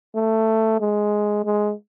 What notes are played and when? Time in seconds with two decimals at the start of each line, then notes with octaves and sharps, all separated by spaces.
0.15 A3
0.80 G#3
1.45 G#3